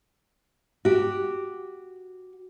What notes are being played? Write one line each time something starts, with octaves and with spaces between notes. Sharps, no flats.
F#4 G4